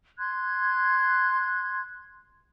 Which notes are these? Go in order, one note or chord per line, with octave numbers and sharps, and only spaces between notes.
C6 F#6 G#6